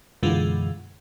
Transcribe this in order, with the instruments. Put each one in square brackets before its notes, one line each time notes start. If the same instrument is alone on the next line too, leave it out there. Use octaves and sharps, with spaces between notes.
[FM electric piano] F#2 B2 D3 E3 G#3 F4